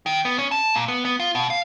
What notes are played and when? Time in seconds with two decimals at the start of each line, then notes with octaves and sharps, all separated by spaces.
0.06 D#3
0.25 B3
0.39 C#4
0.51 A5
0.74 A#2
0.88 B3
1.05 B3
1.20 F4
1.35 B2
1.50 F5